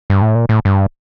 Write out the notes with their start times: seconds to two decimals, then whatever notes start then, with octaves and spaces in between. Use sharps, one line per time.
0.10 G2
0.22 A2
0.35 A#2
0.49 A2
0.65 G2